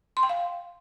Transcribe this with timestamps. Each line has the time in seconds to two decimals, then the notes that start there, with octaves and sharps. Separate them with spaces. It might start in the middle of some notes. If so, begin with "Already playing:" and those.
0.17 C6
0.23 G5
0.29 F5